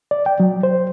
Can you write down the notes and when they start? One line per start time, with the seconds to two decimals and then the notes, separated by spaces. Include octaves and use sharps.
0.11 D5
0.26 G5
0.40 F#3
0.63 C5